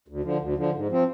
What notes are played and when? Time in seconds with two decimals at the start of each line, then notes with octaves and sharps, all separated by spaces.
0.08 D2
0.24 D3 F3
0.41 D2
0.58 D3 F3
0.74 G#2
0.90 F3 C4